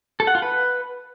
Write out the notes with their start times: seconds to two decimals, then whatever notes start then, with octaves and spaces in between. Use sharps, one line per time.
0.20 A4
0.27 F#5
0.35 F4
0.42 B4